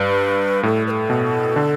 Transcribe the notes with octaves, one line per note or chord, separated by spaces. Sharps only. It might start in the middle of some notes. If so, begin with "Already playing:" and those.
Already playing: G2 B4
A2 A4
B4
A4
B2
D3